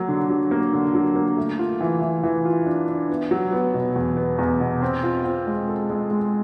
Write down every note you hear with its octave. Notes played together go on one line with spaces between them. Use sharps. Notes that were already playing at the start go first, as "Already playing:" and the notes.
Already playing: F#3 A#3
D3
F#3
A#3
D3
F#3
A#3
A3
F4
E3
E3
E3
F4
D4
D4
B3
F#3
B3
B2
E2
B3
E2
B2
C4
F4
C4
G#3
A4
G#3
G#3